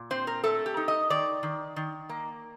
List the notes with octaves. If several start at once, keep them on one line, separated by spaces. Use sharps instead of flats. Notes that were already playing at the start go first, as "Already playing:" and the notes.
Already playing: A#2
C4 C5
A#4
A3 A4
G4
D#4
D#5
D#3 D5
D#3
D#3
A#3